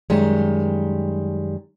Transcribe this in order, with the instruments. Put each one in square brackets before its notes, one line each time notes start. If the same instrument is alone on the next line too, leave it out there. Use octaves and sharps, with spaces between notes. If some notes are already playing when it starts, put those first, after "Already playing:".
[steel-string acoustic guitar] F#2 D#3 G3 G#3